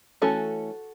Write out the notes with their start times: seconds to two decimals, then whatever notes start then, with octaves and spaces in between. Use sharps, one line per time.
0.22 E3 A3 C#4 F#4 A4